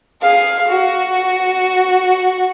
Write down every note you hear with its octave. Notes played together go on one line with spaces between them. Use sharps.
G#4 F5
F#4